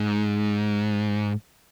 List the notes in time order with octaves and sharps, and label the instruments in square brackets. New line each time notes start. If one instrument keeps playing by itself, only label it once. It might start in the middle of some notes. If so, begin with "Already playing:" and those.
Already playing: [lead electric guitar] G#2